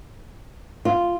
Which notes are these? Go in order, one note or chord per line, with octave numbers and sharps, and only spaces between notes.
F4